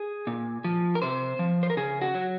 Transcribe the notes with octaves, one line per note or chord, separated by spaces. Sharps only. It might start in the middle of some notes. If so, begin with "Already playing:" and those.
Already playing: G#4
A#2
F3
A#4
C3 C5
F3
C5
A#4
C#3 G#4
F#4
F#3